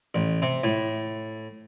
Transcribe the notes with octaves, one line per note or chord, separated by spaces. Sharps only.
A1
C3
A2